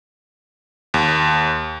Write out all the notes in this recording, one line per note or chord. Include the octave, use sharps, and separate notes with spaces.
D#2